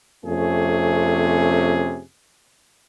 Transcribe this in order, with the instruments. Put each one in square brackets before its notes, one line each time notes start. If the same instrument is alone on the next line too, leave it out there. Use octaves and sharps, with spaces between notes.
[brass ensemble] F2 C3 A3 C#4 G#4